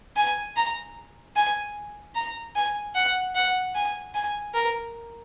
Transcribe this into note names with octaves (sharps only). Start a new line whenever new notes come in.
G#5
A#5
G#5
A#5
G#5
F#5
F#5
G#5
G#5
A#4